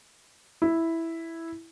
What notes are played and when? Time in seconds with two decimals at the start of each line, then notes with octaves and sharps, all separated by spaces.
0.62 E4